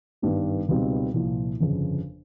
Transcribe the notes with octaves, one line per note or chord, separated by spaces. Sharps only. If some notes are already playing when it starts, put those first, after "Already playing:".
G#1 G2 D#3 G3 B3
C#2 B2 G3 C4 D#4
C2 A#2 F3
G1 F2 C#3